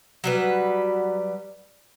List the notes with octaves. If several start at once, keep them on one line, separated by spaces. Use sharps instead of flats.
F#3 G3 B4